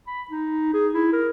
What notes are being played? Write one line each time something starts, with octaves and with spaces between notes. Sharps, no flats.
B5
D#4
G#4
E4
A#4